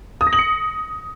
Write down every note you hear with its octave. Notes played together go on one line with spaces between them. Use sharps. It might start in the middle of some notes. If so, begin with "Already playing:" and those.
D#6
A#6
F#7
C#7